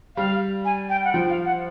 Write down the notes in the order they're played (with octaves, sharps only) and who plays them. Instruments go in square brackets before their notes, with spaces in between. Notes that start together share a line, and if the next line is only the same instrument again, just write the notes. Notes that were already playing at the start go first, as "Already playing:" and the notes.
[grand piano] G3 [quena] F5
[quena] G#5
G5
F#5
[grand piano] F3 [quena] G5
[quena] F5
F#5